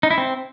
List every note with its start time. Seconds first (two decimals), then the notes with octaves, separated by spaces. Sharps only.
0.03 D#4
0.10 E4
0.18 C4